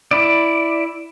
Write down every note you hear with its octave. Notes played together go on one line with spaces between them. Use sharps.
E4 D5